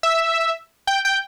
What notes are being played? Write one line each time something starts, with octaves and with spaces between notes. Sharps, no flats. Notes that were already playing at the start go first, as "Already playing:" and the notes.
E5
G5
G5